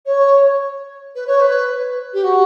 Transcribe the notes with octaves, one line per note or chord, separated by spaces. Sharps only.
C#5
B4
C#5
B4
G4
F#4